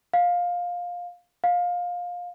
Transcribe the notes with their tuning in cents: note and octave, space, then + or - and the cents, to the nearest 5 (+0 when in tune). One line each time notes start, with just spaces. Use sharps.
F5 +15
F5 +20